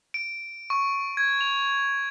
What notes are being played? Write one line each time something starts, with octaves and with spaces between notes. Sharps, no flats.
D7
C#6
G#6
F7